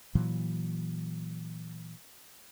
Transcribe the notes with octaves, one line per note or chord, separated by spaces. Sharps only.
A#2 E3 F#3